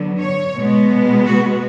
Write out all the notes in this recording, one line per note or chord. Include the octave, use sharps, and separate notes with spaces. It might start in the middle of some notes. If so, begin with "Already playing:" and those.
Already playing: D3 F#3 B3
C#5
B2 G#3 B3
F#4